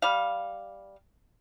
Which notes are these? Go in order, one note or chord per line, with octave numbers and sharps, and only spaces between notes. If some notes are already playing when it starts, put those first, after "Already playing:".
G3 F5